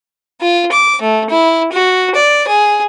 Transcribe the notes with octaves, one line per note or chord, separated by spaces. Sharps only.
F4
D6
A3
E4
F#4
D5
G#4